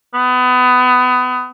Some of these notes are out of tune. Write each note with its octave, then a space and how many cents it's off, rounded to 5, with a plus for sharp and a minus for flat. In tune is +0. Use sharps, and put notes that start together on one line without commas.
B3 +25